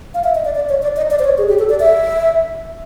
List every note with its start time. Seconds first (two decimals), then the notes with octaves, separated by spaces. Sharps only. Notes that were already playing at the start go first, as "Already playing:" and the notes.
0.14 F5
0.24 E5
0.35 D#5
0.45 D5
0.55 D5
0.69 C#5
0.83 D5
0.96 D#5
1.11 D5
1.19 C5
1.24 C#5
1.38 G#4
1.49 G4
1.59 A4
1.69 D5
1.80 E5